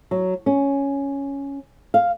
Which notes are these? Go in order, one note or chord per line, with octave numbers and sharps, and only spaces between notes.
F#3
C#4
F5